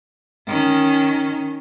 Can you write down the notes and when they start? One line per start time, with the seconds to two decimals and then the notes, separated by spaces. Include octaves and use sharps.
0.47 D#3 C#4